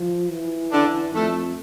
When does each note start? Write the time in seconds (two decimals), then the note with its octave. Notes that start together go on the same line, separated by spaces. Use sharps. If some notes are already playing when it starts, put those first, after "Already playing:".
Already playing: F3
0.30 E3
0.71 D3 D4
1.14 F2 A3 A4